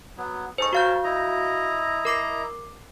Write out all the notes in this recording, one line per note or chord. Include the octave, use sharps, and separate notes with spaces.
F#3 B3
D#4 G#4 A4 C5 C#6
F#4 A#4 C#5 F5 A5 G6
E4 D#5 A#5
A#4 D6 C7